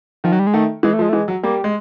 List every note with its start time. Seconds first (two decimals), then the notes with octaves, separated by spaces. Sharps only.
0.24 D#3 F3
0.32 F#3
0.39 G3
0.47 G#3
0.54 D#3 A3
0.83 E3 G#3
0.93 A3
0.99 F3
1.02 G#3
1.09 A3
1.13 E3 G#3
1.28 F#3
1.43 G3 A#3
1.64 G#3